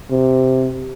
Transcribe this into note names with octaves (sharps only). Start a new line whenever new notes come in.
C3